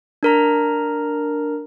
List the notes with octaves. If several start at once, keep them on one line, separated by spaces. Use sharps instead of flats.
D4 A#4 A#5